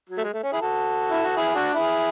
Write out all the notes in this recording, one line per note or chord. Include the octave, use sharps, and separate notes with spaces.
F#3
A3
G#3
A3
C#4
E4 G#4
F#4 A4
E4
F#4
E4 G#4
D4 F#4
E4 G#4